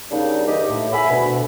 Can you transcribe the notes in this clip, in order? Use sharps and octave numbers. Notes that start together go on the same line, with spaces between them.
C#3 G3 A#3 D4 D#4
C2 G2 D3 E3 G4 D#5
A2
E5 F#5 G#5 B5
D2 B2